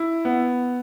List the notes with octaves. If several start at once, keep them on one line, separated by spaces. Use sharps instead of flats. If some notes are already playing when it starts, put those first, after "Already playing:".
Already playing: E4
B3